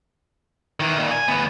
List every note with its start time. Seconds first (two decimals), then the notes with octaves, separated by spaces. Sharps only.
0.80 D#3 E3
0.98 A#2 D#3
1.11 G#5
1.28 D2 B3